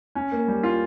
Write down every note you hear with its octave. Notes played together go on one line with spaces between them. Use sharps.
C#4
A#3
G3
F4